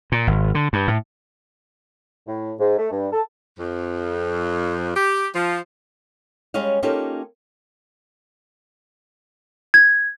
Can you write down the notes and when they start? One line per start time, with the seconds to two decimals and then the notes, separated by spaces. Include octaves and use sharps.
0.12 A#2
0.27 G#1
0.55 D3
0.73 G2
0.88 A2
2.27 A2
2.60 G#2
2.78 A3
2.91 G2
3.12 A4
3.59 F2
4.96 G4
5.35 F3
6.54 G3 G#3 C#4 C#5 D#5 F5
6.83 A#3 C#4 D#4 F4 G4 A4
9.74 G#6